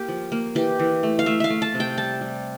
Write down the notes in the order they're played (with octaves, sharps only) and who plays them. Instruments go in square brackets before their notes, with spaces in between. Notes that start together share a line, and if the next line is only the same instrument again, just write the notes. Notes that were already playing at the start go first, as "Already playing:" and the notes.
Already playing: [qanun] A#3 G4
F3
A#3
E3 G4
E3
A3
F5
A3 E5
E5 F5
A3
A5
C3
G5
G3 A5
G3